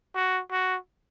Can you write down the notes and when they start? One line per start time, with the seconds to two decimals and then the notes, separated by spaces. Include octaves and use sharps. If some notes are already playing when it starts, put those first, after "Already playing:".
0.15 F#4
0.51 F#4